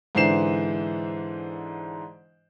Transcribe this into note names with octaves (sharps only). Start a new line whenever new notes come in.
G#2 D3 E3 C5 C7 E7